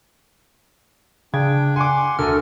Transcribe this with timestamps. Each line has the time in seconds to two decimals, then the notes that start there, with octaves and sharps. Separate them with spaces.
1.34 C#3 D4 G5 G#6
1.76 F#5 G#5 C6 D6
2.19 D2 A3 A4 A#4 F6